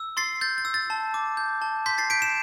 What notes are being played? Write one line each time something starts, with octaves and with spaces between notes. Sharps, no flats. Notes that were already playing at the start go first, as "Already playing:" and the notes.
Already playing: E6
C6 A6 C7
G6 A6
A6
E6
A6
A5
D6
G6
A5
C6 G6 B6
A6 C7
G6 B6 D7
C7 E7